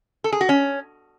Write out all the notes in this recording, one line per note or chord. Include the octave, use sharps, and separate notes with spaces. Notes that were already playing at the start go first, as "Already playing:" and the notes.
A4
G#4
F#4
C#4